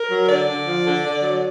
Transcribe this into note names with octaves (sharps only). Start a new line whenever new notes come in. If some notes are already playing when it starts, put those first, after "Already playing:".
Already playing: A#4
F#3
D3 D5
D3
F3
D3
D3
F#3